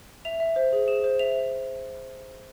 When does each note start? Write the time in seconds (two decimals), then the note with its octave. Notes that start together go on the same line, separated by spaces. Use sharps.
0.25 E5 F7
0.40 E5
0.56 C5
0.73 G#4
0.88 G#4 E7
1.04 C5
1.19 E5 F7